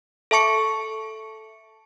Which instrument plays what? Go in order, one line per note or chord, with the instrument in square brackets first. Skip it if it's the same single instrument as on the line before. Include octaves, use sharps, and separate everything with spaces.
[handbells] A4 E5 A5 C#6 C#7